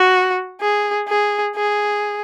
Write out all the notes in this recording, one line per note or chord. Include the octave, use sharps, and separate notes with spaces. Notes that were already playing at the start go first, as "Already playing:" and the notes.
Already playing: F#4
G#4
G#4
G#4